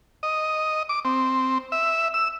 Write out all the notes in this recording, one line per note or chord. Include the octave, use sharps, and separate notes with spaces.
D#5
D6
C4
E5
E6